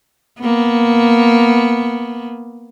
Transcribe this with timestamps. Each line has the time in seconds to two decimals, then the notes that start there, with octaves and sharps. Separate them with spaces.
0.41 A#3 B3